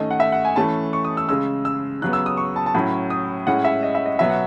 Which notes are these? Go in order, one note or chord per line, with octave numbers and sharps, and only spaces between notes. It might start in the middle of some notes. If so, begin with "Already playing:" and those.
Already playing: D#3 A3 C#4 D#5
F#5
E5
F#5
G#5
E3 A3 C#4 A5
C#6
D#6
E6
C#3 G#3 C#4 E6
E6
C#3 F#3 B3 F#6
E6
D#6
C#6
A5
A5
A2 F#3 C#4 B5
D#6
A2 G#3 C#4 F#5
E5
D#5
E5
D#5
B2 F#3 B3 E5
F#5